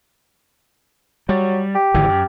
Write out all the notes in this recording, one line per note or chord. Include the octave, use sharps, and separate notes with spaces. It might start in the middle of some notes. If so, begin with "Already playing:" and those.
F#3 G3
G4
G#1 D3 E3
F#2